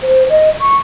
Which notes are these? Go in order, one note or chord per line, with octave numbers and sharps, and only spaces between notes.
C5
D#5
C#6